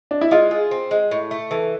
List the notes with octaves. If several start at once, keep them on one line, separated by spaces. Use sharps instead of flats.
D4
E4
G#3 F4
G#4
C4
G#3
A2
A3
E3 A4